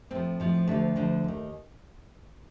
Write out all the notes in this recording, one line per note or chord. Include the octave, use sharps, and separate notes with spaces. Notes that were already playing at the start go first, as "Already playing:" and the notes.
A2 F3 C4
A2 F3
D2 D3 F3 A3
D2 D3 F3
D#2 D#3